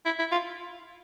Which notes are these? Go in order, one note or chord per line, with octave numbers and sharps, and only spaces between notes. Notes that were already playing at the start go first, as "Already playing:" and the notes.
E4
E4
F4